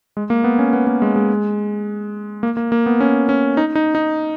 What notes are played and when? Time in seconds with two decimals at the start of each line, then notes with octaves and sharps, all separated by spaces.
0.17 G#3
0.30 A#3
0.44 B3
0.59 C#4
0.73 B3
0.87 A#3
1.02 G#3
1.16 G#3
2.43 A#3
2.57 A#3
2.72 A#3
2.86 B3
3.00 C#4
3.29 C#4
3.57 D#4
3.75 D#4
3.95 D#4